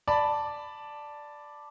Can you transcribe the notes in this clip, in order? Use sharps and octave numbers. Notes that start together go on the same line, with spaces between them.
D5 A5 B5